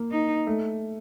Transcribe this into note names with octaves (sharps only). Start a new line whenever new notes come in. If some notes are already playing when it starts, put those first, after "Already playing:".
Already playing: A#3
D#4
A3